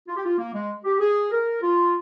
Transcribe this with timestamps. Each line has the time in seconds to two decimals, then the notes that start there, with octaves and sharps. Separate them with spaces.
0.08 F4
0.17 G4
0.25 F4
0.38 A#3
0.54 G#3
0.84 G4
1.00 G#4
1.31 A#4
1.62 F4